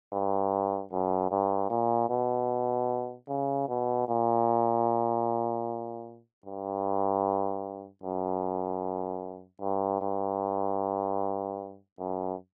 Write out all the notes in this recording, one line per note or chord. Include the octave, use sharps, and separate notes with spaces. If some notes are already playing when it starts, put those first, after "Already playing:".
G2
F#2
G2
A#2
B2
C#3
B2
A#2
G2
F#2
G2
G2
F#2